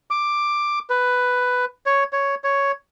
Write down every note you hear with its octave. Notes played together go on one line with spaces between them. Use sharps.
D6
B4
C#5
C#5
C#5